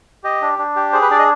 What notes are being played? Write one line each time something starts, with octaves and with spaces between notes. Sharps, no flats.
G4 D#5
D4
D4
G4
G#4 C5
B4
D4 D5
D#5